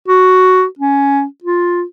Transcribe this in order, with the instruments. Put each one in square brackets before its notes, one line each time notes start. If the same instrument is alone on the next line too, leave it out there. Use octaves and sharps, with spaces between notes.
[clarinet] F#4
C#4
F4